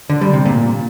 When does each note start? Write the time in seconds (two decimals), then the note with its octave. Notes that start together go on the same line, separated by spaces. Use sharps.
0.09 D3
0.21 G3
0.33 C3
0.45 A#2